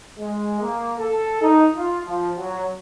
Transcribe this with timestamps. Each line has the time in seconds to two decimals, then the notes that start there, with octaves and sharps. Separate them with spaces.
0.18 G#3
0.61 A#3
0.98 A4
1.41 D#4
1.75 F4
2.06 F3
2.37 F#3